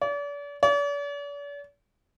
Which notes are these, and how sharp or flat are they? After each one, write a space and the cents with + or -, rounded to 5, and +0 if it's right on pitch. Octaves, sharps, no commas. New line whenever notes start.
D5 -40
D5 -45